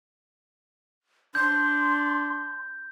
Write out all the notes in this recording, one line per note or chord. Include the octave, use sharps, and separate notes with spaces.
D4 C6 G6